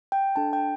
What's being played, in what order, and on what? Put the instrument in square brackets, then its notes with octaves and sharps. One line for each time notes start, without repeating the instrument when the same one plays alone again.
[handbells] G5
D4 A4 A5
G5